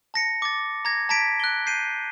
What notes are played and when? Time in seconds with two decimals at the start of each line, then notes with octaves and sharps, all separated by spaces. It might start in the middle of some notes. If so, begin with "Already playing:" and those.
0.14 A5 A#6 C#7
0.42 D6 A6
0.85 A#5 G#6 A#6
1.09 A5 A#5 G#6 B6 D7
1.40 F#6 G7
1.66 G6 C7 D#7